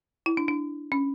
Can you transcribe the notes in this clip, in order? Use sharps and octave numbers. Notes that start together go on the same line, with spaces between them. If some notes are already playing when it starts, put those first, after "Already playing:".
E4
D4
D4
C#4